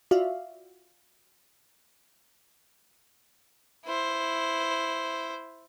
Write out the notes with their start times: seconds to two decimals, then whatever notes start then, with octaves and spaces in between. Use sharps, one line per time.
0.11 F4 F#4 D5 E5 F5
3.85 E4 C5